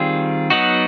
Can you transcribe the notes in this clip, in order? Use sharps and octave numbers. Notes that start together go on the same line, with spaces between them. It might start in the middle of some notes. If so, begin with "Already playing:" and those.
Already playing: D#3 G3 C4 F4 G#4
F#3 B3 D#4 F#4